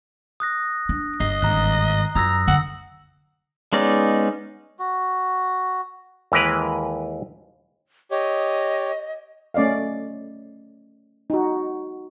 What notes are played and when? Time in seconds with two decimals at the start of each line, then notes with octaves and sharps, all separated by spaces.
0.40 D#6 F#6 A#6
0.89 D4
1.20 G1 D#5 C7
1.42 G#1 G2 A#5 F#6
2.15 F#2 F4 A#5 D#6 E6 A#6
2.48 D3 F#5 E6
3.73 G#3 B3 C#4 D#4 D5
4.79 F#4
6.32 D#2 E3 G#3 A#4 B4
8.11 G4 C#5 D#5
9.54 A3 C#4 D5 D#5 F5
11.30 D#4 F#4